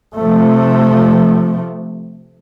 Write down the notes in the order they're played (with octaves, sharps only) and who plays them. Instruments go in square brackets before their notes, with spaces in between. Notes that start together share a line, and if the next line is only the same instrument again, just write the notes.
[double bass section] C3 F3 A3